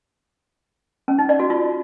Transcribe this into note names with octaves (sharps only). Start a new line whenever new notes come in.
C#4
D#4
D5
F#4
F4